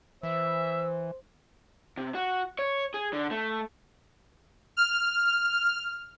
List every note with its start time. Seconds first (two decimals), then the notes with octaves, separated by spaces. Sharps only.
0.23 E3 C5 E5 E6
1.97 C3
2.15 F#4
2.59 C#5
2.94 G#4
3.13 D3
3.31 A3
4.77 F6